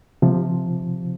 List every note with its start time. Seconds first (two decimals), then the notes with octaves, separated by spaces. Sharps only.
0.22 C3 F3